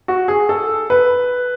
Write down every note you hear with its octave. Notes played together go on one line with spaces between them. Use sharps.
F#4
G#4
A4
B4